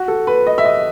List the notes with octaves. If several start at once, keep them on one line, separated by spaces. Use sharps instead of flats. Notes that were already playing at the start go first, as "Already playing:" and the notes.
Already playing: F#4
A4
B4
D#5
E5
D#5